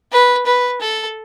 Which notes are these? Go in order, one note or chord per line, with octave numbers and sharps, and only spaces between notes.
B4
B4
A4